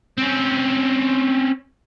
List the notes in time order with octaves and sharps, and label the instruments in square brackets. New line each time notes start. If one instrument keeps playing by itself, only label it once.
[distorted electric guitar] C4 C#4